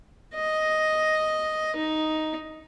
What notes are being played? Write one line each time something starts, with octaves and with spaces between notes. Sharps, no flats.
D#5
D#4